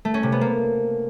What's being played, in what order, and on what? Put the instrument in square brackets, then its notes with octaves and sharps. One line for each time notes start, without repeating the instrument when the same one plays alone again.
[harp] A3
C#4
C3
B3
A#3